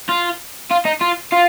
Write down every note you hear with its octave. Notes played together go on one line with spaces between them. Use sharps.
F4
F4
D#4
F4
F4